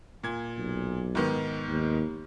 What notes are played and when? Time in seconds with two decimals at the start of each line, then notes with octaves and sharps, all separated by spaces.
0.23 A#2 G#6
0.58 B1
1.15 G#2 D#3 B3
1.68 D#2